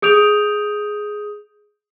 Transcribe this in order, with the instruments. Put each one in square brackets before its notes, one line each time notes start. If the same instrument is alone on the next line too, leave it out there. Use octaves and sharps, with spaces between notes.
[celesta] G#4 D#6 G6 D7 F7